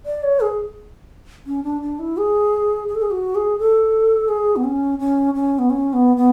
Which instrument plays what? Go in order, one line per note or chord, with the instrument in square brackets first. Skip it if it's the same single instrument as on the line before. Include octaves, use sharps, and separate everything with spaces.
[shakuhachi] D5
C#5
G#4
C#4
D4
D4
E4
G#4
G#4
A4
G#4
F#4
G#4
A4
G#4
B3
C#4
C#4
C#4
B3
C#4
B3
B3